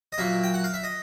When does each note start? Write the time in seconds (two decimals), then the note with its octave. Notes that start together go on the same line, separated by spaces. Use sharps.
0.12 D#5
0.18 A#2 F#3 A#3 E5
0.43 G5
0.54 F#5
0.64 F5
0.74 E5
0.84 D#5